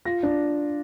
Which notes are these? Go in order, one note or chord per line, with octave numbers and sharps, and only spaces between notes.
F4 A#6
D4